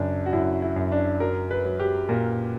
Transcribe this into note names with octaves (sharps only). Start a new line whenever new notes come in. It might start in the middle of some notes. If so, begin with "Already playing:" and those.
Already playing: F#2 C#3 D4
F#4
F#2 E4
E4
F#2
D4
F#3 A#4
B4
F#3
G4
A#2 A#4